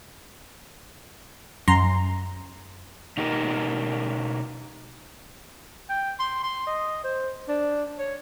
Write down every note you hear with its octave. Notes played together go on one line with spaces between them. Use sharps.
F#2 A#5 C6
B2 D#4 G4 A#4
G5
C6
C6
D#5
C5
D4
C#5